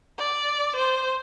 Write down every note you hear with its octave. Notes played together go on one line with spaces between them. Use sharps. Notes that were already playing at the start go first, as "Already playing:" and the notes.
D5
C5